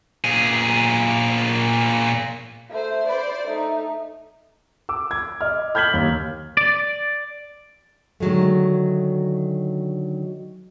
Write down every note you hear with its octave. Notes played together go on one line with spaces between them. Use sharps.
A#2 G#4
A3 C5
C5 D5
A3 D#4
D6 E6
G#6
D#5 F6
F6 G6 G#6 B6 F#7
D#2
D5
D3 D#3 F#3 G#3 A3